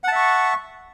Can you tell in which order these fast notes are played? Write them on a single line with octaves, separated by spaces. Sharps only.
F#5 A5 E5 C#6